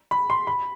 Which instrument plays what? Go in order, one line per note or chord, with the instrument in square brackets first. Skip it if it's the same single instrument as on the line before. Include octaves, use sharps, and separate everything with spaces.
[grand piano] B5
C6
B5